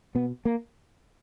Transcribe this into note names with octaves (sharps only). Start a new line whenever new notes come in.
B2 B3
A#3